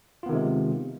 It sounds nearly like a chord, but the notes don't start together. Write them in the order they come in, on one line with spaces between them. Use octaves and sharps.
F4 B3 D#3 C3 G#3